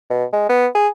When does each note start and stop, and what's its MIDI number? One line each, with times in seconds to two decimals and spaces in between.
0.10 0.25 47
0.33 0.49 56
0.49 0.67 59
0.75 0.88 68